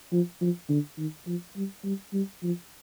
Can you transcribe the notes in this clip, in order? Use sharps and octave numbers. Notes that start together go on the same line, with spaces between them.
F3
F3
D3
D#3
F3
G3
G3
G3
F3